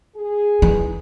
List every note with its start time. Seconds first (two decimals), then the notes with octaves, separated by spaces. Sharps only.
0.15 G#4
0.62 E3